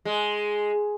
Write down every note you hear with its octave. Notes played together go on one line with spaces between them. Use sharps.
G#3